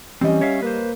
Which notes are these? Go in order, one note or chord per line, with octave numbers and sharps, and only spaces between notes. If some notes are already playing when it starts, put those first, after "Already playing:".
E3 G3 C4 C#4 D#5
C#5 E5 F5
A#3 B4 C5